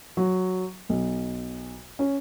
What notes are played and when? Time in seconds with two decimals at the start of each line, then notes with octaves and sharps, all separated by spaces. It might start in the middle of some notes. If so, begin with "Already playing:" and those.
0.17 F#3
0.89 B1
1.99 C#4